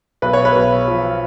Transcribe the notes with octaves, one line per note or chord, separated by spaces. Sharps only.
B1 B4
C#5
B4
B1
F3